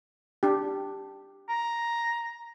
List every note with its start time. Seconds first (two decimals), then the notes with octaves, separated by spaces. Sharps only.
0.43 D4 G4
1.49 A#5